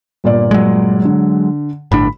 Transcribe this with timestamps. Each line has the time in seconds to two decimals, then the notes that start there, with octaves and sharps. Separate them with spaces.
0.24 G1 A#2 D5
0.51 F#3 G#3
1.05 D3
1.92 G1 A2 D4 B5